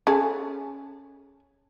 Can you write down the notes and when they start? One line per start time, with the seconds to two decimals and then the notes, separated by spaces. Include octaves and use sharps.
0.07 C#4 G#4 A4